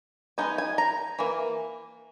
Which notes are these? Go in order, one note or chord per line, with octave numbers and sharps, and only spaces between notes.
G#3 B3 D#4 G#5
G#5
A#5
E3 A#3